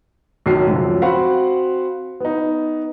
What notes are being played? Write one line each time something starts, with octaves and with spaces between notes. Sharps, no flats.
B1 F#2 D#3 F#3 C7
C#2 F#2 F3
C4 F#4 F5 F#5 B5 C6
B3 D#4